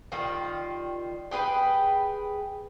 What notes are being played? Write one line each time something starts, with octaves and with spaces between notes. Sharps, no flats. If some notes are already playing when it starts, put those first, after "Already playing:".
D#3 G3 F4
G4 G#4 B4 G5